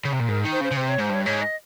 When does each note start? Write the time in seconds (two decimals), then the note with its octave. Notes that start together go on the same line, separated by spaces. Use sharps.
0.05 C#3
0.13 C3
0.20 A#2
0.28 G#2 A#4
0.45 D#3
0.52 C5
0.61 C#3
0.64 C5
0.71 C#3
0.77 C3 C5
0.89 C#5
0.98 G#2 C5
1.09 G2 C#5
1.25 G#2 C#5
1.41 D#5